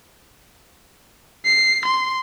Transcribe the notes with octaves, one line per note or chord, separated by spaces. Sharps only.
C7
C6